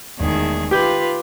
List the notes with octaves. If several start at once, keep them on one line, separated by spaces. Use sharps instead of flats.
E1 D#3 A3 G#4
F4 G4 B4 G6